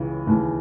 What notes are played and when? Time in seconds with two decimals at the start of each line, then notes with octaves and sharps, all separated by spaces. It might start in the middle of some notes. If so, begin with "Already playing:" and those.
Already playing: C#2 C#3 E3
0.27 D#2 C#3 E3